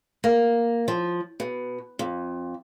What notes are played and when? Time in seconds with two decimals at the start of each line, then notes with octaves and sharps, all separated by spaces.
0.24 A#3
0.88 F3
1.40 B2
1.99 F2